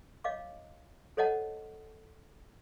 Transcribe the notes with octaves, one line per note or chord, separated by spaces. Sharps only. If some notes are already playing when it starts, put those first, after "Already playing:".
C#5 D#5 F5 D6
A4 C5 C#5 D#5 F#5 A5